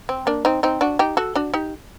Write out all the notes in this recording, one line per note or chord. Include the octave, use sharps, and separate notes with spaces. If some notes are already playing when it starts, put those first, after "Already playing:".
C4
A#3 D4
C4 D#4
C4 D#4
D4 F#4
D#4 G4
F#4 A4
D4 F#4
D#4 G4